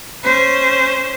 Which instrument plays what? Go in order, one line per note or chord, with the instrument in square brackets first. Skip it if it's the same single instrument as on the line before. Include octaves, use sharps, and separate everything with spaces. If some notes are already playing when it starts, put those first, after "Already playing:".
[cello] C#4 C5